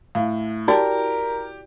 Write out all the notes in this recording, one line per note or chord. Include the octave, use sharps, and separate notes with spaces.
A2 F5
E4 F#4 G4 A#4 D5 A5